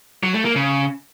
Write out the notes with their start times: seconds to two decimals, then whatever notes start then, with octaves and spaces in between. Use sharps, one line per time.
0.23 F#3
0.34 A3
0.45 A#3
0.56 C#3